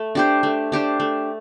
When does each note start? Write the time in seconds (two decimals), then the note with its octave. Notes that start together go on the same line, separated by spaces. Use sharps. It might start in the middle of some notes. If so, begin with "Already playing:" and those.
Already playing: A3
0.15 D4 G4 C5
0.43 A3
0.72 D4 G4 C5
1.00 A3